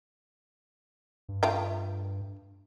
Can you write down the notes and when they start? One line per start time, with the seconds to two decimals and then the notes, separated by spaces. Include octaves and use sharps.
1.29 G2
1.43 A3 F4 G5